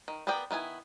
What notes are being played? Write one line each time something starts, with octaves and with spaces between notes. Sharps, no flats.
D#3
B3 G#4 A#4 D5 G5
D#3 B3 E4 G#5